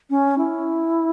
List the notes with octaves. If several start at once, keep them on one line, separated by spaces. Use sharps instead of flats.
C#4
E4